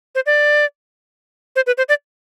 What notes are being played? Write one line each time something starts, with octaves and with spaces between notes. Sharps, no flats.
C5
D5
C5
B4
C5
D5